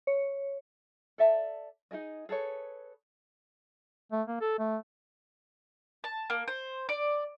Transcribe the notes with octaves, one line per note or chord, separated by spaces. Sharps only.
C#5
A4 D5 E5 A5
D#4 E4 G#4 D#5
G#4 A4 B4 C#5
A3
A#3
A4
A3
A5
A#3
C5
D5